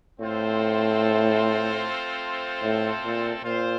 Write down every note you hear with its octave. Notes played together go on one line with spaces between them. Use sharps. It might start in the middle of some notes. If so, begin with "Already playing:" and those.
A2 A3 C4 F4 A4 C5
A2
A#2
A#2 C4 F4 C5